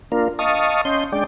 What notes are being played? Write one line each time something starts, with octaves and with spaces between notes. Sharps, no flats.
A#3 D4 F4 A#4
D#5 F5 A5 C#6 D#6
C#4 D#5 C6 G6
G#3 D4 D5 G5